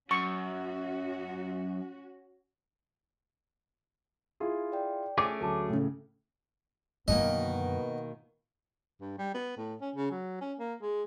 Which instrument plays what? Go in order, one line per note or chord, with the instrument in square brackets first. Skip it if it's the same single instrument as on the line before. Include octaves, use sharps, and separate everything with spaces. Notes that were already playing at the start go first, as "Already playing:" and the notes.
[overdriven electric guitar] F#2 [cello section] C#4 F#4 [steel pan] C#6
[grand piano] E4 F4 G#4
[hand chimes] D5 G5
[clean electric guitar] A3 C#4 G#4 [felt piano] D6
[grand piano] D2 F#3 A5 [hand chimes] A4
[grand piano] A2 C#3
[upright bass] F#2 D3 [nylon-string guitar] B2 D#3 A#3 [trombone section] B3 [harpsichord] D#5
[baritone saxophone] G2
G3
B3
A2
C#4
C#3
F#3
C#4
A#3
G#3